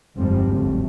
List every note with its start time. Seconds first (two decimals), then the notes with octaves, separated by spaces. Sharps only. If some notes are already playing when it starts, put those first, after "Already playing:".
0.17 G1 F2 G#2 F3 G3 C4
0.48 F#1 D2 A3